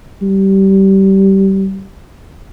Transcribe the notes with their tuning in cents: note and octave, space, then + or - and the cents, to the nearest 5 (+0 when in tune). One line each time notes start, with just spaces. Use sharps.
G3 -20